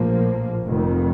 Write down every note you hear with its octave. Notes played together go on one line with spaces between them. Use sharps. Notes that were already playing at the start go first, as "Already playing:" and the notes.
Already playing: A#1 A2 F3 A#3
F1 F2 D#3